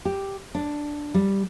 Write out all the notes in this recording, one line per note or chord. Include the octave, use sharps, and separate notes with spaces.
G4
D4
G3